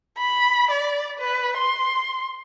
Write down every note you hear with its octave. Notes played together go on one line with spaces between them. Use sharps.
B5
D5
B4
C6